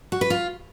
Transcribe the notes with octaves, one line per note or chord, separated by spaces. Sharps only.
F#4
B4
F4